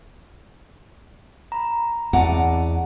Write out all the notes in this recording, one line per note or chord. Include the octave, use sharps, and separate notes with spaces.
A#5 B5
E2 C4 D#5 F#5 A5 A#5 D6